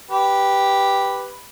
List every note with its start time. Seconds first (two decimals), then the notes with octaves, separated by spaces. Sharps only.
0.11 G4 B4